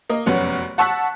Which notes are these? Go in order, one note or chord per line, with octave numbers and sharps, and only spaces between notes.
A#3 D#5
F1 F#2 B3 C#4
F#5 A5 C#6 E6 F#6 B6